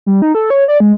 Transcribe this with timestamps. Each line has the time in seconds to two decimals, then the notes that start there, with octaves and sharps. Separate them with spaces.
0.06 G3
0.22 D#4
0.35 A4
0.50 C#5
0.68 D5
0.80 G#3